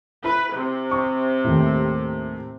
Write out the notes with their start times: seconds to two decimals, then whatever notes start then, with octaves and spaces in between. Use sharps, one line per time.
0.24 E4 B4
0.56 C3
0.91 C#6 D#6
1.44 D#2 A2